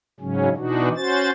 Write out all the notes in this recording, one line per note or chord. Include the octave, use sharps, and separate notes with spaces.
G#2 C#3 F#3 C#4
B2 E3 D4 D#4 F#4
C#4 F#4 C5 A6